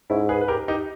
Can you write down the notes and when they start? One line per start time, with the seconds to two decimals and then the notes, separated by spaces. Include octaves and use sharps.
0.10 G#2 C#4 E4
0.29 G#4 B4
0.41 B4
0.48 G4 A#4
0.68 D#4 G4